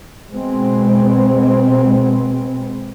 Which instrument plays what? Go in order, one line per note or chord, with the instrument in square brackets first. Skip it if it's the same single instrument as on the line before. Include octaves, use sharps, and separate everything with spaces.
[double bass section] B2 G#3 B3 C4